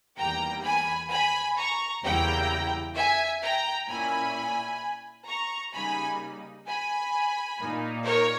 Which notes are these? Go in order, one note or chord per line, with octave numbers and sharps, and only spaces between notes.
E2 D#3 G3 A#3 G5 A#5
G#5 B5
G#5 B5
A#5 C#6
E2 C#3 G3 A#3 E4 G5 A#5
E5 G#5
G5 A#5
A#2 A#3 C#4 E4 G#5 B5
A#5 C#6
C#3 G3 A#3 D#4 G#5 B5
G#5 B5
A#2 A#3 D#4
A#4 C#5